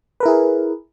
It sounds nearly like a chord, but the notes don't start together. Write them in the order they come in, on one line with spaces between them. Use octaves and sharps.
B4 A#4 E4 G#4